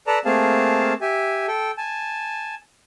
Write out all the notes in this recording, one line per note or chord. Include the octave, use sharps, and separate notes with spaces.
A4 B4 D5 A5 A#5
A3 A#3 C4 G#4 F5 A5
G4 E5 G#5
A4 G5
G#5 A5